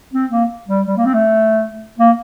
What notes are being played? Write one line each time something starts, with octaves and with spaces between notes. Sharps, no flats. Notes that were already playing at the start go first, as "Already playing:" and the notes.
C4
A#3
G3
G3
A#3
C4
A3
A#3